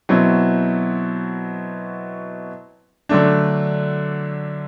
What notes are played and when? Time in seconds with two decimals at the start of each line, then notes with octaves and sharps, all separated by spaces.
0.09 B2 F#3 C4 E4
3.09 D3 F#3 A3 D4